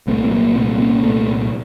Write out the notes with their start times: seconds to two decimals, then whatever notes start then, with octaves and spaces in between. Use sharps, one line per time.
0.07 C2 A#2 A3 C4
0.25 A3
0.31 F#3 A#3
0.56 C2 A#2 A3 C4
0.80 A#3 C#4
1.03 C2 A#2 A3 C4